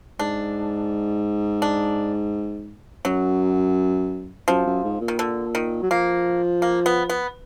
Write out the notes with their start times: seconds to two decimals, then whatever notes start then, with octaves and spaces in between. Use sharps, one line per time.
0.19 G#2 D4
1.62 D4
3.05 F#2 F#3
4.48 F#2 F3
4.66 F#2
4.84 G#2
5.01 A#2
5.08 D#3
5.19 D3
5.55 D#3
5.82 F#3
5.91 F3 A#3
6.62 A#3
6.86 B3
7.10 B3